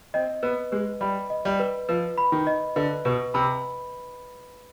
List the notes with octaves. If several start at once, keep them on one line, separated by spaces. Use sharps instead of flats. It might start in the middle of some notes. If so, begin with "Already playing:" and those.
C4 D#5
B3 B4
G#3 B4
G3 B5
D#5
G3
B4
F3 B4
B5
D#3
D#5
D3 B4
B2 B4
C3 B5